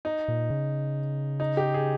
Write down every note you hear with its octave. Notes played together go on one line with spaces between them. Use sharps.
D#4
A#2
C#3
D#4
G4
G#4